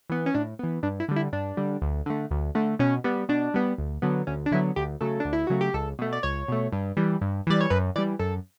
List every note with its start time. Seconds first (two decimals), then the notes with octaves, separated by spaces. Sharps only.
0.10 E3 B3
0.26 C#4
0.34 A2 D4
0.59 E3 B3
0.83 G2 D4
1.00 E4
1.09 D3 G3
1.16 E4
1.33 G2 D4
1.57 D3 G3
1.82 D2
2.06 D3 A3
2.31 D2
2.55 D3 A3
2.79 B2 C#4
3.04 G3 B3
3.29 B2 D4
3.54 G3 B3
3.78 D2
4.02 D3 F#3 B3
4.27 D2 C#4
4.46 D4
4.51 D3 F#3 B3 E4
4.76 D2 G4
5.01 C#3 F#3 A3 A4
5.20 D2 D4
5.33 E4
5.47 C#3 F#3 A3 F#4
5.61 G4
5.74 C#2 A4
5.99 B2 A3
6.13 D5
6.23 C#2 C#5
6.48 B2 A3
6.72 G2
6.97 E3 G3
7.21 G2
7.47 E3 G3 D5
7.61 C#5
7.70 F#2 B4
7.96 E3 G3 D5
8.19 F#2 A4